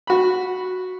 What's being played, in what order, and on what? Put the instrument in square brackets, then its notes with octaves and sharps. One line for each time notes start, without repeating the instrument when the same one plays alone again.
[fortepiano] F#4 B5